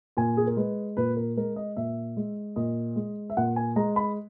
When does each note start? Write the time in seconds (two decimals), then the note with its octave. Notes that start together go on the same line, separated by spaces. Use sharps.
0.17 A#2 G#5
0.37 G#4
0.47 A#4
0.57 G#3 B4
0.97 A#2 B4
1.16 A#4
1.37 G#3 A#4
1.56 D#5
1.77 A#2 E5
2.17 G#3
2.56 A#2 D#5
2.96 G#3
3.30 E5
3.37 A#2 F#5
3.56 G#5
3.76 G#3 A#5
3.96 B5